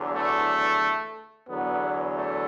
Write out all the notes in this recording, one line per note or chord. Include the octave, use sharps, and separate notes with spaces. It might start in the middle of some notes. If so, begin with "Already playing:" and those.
Already playing: E2 D3 F#3
A3
E2 D3 F#3 B3
A3